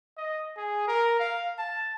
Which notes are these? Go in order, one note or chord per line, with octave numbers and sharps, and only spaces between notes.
D#5
G#4
A#4
F5
A5